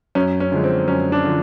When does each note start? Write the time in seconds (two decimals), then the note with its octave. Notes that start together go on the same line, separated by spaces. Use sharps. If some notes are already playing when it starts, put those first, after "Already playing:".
0.15 F#2 C#4
0.40 C#4
0.52 D3 F3 G#3
0.64 C4
0.88 F#2 C#4
1.12 D4
1.24 D3 F3